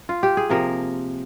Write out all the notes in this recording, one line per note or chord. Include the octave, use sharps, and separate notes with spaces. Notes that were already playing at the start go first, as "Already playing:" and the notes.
Already playing: D#4
F4
G4
G#4
C3 F3 A#3 A#4